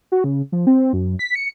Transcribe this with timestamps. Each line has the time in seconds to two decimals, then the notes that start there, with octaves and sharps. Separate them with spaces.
0.12 F#4
0.24 C#3
0.52 F3
0.67 C4
0.93 F#2
1.19 B6
1.35 C#7